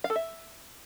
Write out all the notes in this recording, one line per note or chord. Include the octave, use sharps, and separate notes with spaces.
F5
A4
E5